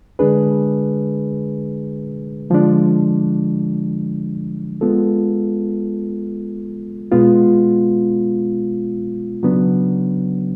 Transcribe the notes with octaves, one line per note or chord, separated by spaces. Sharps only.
D3 G#3 D4 G#4 B4
D3 F3 G#3 D4
G#3 B3 F4 A4
B2 G#3 B3 F4
C#3 F#3 B3 D4